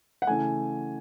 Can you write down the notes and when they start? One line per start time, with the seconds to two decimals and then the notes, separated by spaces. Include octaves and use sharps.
0.22 F#5
0.27 C#3 E3 A3 G#5